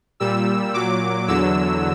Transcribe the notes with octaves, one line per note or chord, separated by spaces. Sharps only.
A#2 G3 E6
A#2 F#3 D6
E2 D3 F#3 E6